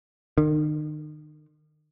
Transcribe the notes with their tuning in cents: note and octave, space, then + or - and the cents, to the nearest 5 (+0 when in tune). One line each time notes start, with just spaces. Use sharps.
D#3 -40